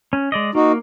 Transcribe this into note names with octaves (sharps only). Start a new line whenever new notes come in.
C#4
G#3 D5 D#5
A#3 D#4 F#4